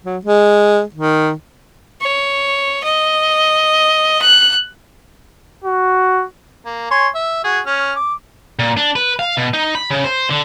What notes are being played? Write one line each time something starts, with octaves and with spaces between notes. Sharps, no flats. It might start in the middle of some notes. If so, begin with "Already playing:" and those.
F#3
G#3
D#3
C#5
D#5
F#6
F#4
A#3
C#5 G#5 C6
E5
F#4 G#4
C#4 F6
D6
A#2
D4
B4
F5
B2
D#4
B5
C#3
C5
D3